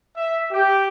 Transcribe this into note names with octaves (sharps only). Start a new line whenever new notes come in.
E5
G4